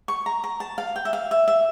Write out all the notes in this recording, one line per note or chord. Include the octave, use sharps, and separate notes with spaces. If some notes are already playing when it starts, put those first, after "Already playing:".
C#6
A#5
A#5
A5
F5
G5
E5
F5
E5
E5